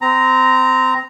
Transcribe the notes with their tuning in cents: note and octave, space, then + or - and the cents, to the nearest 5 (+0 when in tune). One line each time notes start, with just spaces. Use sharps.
C4 -20 A#5 +0